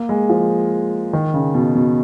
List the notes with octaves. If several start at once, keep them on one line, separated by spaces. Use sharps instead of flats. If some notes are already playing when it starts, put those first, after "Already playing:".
Already playing: A#3
G#3
F3
D#3
C#3
B2
B2